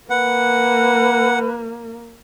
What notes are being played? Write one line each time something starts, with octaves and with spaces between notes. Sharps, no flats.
A#3 B4 F#5